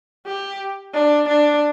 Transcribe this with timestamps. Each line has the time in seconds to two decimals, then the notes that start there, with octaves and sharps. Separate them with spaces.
0.27 G4
0.94 D4
1.28 D4